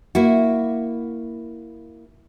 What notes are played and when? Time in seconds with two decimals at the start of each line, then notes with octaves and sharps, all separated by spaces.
0.15 A#3 E4 F#4